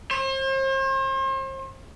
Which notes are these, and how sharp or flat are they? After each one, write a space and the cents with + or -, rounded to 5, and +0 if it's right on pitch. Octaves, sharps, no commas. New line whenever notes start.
C5 +40